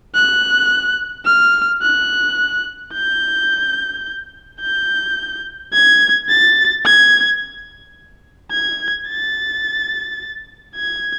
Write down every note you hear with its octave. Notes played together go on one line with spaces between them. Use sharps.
F#6
F6
F#6
G6
G6
G#6
A6
G#6
G#6
A6
G#6